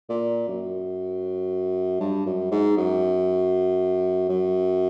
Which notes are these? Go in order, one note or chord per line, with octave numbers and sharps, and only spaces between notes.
A#2
F#2
G2
F#2
G#2
F#2
F#2